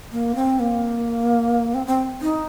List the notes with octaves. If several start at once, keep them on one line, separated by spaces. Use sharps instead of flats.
A#3
C4
A#3
C4
C4
D#4